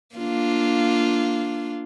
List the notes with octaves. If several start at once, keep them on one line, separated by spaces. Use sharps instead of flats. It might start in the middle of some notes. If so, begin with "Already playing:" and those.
A#3 D4 F4